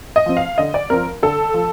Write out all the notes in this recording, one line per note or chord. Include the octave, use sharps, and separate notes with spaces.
D#5
F3 C4
F5
D3 D#5
D5
F3 C4 A#4
D3 A4
F3